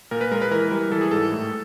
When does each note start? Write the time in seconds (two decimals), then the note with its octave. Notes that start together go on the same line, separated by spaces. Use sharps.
0.11 A#2 A#4
0.21 B4
0.31 G#3 A#4
0.42 B4
0.51 E3 A#4
0.62 B4
0.71 G3 A#4
0.92 E3 A4
1.01 G#4
1.11 G#2 A4
1.32 A2